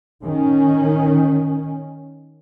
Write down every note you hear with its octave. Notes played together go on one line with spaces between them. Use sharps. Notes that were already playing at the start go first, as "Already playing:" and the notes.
D#3 C#4